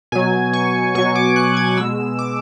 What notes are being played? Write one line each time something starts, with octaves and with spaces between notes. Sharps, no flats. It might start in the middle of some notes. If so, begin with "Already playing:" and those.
B2 F#3 G#5
C#6
B2 F#3 C#6
D6
F#6
G#6
B2 G#3 E6
D6